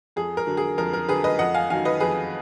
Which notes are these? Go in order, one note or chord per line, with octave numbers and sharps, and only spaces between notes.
F2 G#4
A#4
D3 F#3
G#4
F2 A#4
A#4
D3 F#3 G#4 B4
B4 D#5
F2 D#5 F#5
F5 G#5
D#3 F#3 F5 G#5
B4 D#5
F2 G#4 B4